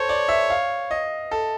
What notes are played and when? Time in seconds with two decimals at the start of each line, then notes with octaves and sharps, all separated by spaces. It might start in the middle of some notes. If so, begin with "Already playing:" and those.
Already playing: A4 C5 C#5
0.09 D5
0.29 E5
0.50 F5
0.91 D#5
1.31 A4